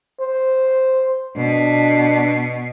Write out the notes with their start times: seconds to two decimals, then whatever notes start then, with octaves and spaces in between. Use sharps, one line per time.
0.20 C5
1.36 B2 D4